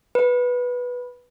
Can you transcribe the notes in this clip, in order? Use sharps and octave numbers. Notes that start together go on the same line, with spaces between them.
B4